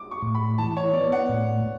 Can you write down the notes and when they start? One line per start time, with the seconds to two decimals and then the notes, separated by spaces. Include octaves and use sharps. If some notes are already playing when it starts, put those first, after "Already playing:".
Already playing: D6
0.11 C#6
0.22 A2
0.35 B5
0.58 E3 A5
0.77 C#5
0.93 B3 D5
1.12 F#5
1.29 A2